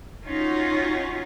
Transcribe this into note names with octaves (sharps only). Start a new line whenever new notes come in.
C#4 D#4 F4 F#4